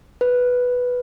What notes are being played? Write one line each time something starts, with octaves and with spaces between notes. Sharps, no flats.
B4